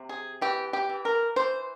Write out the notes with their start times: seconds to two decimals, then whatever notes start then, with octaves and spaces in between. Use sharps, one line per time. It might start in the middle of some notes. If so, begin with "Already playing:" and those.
Already playing: C3
0.09 G#4
0.41 E3 G4
0.73 G4
0.89 E3
1.05 A#4
1.36 E3 C5